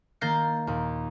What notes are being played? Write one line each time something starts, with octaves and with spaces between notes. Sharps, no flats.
D#3 A#3 G6 A6 A#6 C7
D#2 A#2